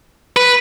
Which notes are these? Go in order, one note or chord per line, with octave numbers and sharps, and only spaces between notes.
B4